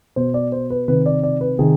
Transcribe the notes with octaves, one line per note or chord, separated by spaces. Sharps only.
B2 C5
D5
C5
B4
C3 D#3 B4
D5
D5
B4
C3 D#3 G#4